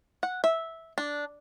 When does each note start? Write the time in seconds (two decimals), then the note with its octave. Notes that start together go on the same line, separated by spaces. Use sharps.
0.23 F#5
0.44 E5
0.98 D4